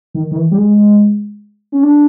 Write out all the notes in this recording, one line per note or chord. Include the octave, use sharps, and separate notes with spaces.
D#3
D#3
E3
G3
G#3
C#4
D4